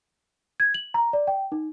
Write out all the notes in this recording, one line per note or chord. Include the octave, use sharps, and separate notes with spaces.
G#6
F#7
A#5
D5
G5
D#4